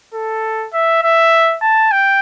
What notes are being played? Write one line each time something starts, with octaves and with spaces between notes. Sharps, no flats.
A4
E5
E5
A5
G5